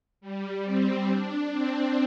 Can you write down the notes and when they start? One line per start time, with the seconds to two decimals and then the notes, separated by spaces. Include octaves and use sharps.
0.21 G3
0.64 C4
1.09 D4
1.52 C4